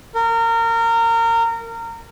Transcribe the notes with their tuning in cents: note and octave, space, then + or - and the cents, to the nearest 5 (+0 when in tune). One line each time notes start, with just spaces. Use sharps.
A#4 -25